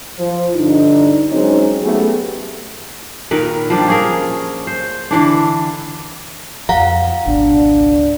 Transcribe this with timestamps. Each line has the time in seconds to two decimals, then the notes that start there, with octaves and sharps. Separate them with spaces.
0.19 F3
0.55 G2 D3 D4 D#4
1.31 F#3 G#3 C4 C#4 D#4
1.83 F#3 A3 B3 C#4 G4 G#4
3.31 A#2 D#3 A#4 B4
3.70 F3 G3 D4
3.88 C#4 G#4 A#4
4.67 C5
5.11 D3 E3 D4
6.69 F2 F3 F5 F#5 A#5
7.27 G#1 C#2 B2 D4